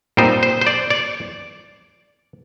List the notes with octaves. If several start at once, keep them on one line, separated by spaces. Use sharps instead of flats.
A#2 G3 C4 D#4 C5
C5
C5
D5
D5